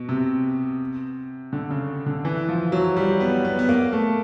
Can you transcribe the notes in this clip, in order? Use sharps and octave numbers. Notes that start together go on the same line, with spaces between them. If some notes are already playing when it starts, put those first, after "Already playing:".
Already playing: B2
C3
D3
C#3
D3
E3
F3
F#3
G3
B3
B3
B3
A#3
A3